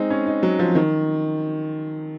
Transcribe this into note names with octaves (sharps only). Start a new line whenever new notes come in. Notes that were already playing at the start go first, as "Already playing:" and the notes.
Already playing: G#3 C4 D#4
C#4
D#4
F#3
F3
D#3